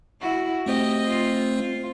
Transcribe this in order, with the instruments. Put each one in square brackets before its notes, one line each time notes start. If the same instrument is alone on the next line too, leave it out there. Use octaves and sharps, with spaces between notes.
[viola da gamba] E4 F#4
[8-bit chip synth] A3 C4 C5 [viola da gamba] G4 D#5
[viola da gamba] F4
F4